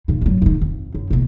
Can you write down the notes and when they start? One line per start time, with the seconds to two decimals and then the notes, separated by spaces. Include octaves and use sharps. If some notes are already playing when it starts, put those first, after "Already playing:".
0.08 A#2 D#3
0.21 G2 F#3
0.42 G#2 D#3
0.61 F2
0.95 F#2
1.11 A#1 B2